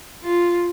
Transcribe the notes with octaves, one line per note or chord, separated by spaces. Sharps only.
F4